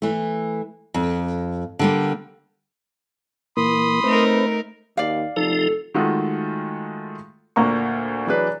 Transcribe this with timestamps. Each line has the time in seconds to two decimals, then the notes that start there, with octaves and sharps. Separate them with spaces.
0.02 E3 A3
0.94 F2
1.79 D3 G3 A#3
3.57 A#2 E3 A#3 B5 C6 D#6
4.04 A3 C4 D#4 A#4 B4
4.97 D#2 D5 F5
5.37 F1 F3 D#4 A4
5.94 D#3 G#3 A3 F4 F#4 A4
7.56 D2 A#2 A#3 A#5 C#6
8.27 E3 F#3 D4 G#4 B4